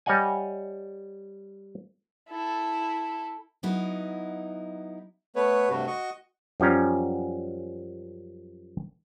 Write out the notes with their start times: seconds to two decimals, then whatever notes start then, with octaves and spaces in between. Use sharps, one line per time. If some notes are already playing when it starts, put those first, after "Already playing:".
0.06 G3 C#5 D#5 F#5 G#5
2.30 E4 A4
3.63 F#3 B3 D#4 E4
5.36 A3 B3 B4 C#5
5.70 G2 C3 A3 F#4
5.87 F#4 D#5 C#6
6.60 F#2 F3 G3 C#4 A#5